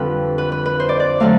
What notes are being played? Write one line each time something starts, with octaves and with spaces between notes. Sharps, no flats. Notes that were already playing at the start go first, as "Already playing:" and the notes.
Already playing: F2 D3 G3 F4 B4
B4
B4
B4
C5
D5
D5
D3 F#3 A3 F5